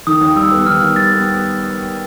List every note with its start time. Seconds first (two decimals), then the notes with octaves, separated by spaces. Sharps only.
0.07 D#3 D#6
0.21 D#2
0.36 G3 E6
0.51 B3
0.66 D#3 F6
0.81 D#2
0.96 G3 A6
1.12 B3